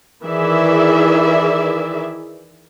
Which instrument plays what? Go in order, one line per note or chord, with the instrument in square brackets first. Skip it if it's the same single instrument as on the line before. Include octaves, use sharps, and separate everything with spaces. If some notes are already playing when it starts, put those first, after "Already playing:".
[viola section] D#3 E3 G#4 D5 E5